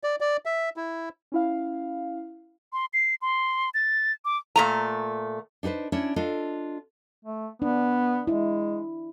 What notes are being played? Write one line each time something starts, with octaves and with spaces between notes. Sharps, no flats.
D5
D5
E5
E4
C#4 E4 F5
C6
C7
C6
A6
D6
A#2 A3 A#5
D4 D#4 F#4 B4 C5
C#4 D4 E4 C#5
D4 F4 A4 D#5
A3
B3 D4
G#3 E4